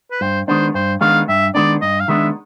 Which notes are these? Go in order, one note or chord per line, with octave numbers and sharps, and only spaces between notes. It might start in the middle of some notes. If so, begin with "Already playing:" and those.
B4
G2 C5
D#3 G#3 B3 D4 C5
G2 C5
D#3 G#3 B3 D4 F5
G2 E5
D#3 G#3 B3 D4 D5
G2 D#5
F5
D#3 G#3 B3 D4 E5